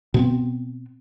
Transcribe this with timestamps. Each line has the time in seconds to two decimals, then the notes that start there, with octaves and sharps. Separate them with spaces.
0.14 B2 B3 C4